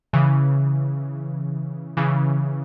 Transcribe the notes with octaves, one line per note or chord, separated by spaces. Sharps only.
C#3 E3
C#3 E3